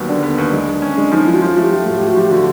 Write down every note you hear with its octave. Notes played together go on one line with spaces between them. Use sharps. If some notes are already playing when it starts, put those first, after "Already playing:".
Already playing: D#2 F#3 G3 B3
D3 D4
B3
D#2
G#3
G#3
C#4
G#3 D4
F3 D#4
F3 E4
F#4
F3 F4
A3
G4
A3
A2 F#4
A2 G4
F#4
F3 G4
D3 F#4